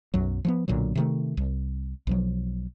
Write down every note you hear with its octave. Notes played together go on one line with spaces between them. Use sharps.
B1 F#2 F#3
F3 F#3 B3
B1 A#2 D3 F#3
C3 D#3 A3
C2
B1 F3 F#3